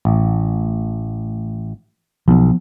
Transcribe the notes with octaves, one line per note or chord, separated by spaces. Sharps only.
A1
B1 F3 B3